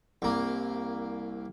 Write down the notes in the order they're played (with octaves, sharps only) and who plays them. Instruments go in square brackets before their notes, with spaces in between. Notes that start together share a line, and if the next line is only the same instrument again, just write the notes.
[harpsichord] C2 A#3